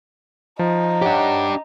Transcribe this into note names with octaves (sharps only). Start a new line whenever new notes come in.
F3 D#4
D4 G4 C#5 F#5